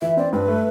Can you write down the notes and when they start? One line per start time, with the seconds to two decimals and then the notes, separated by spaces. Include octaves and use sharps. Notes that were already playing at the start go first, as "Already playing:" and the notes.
0.02 E3 E5
0.17 C4 D5
0.33 G2 B4
0.48 A3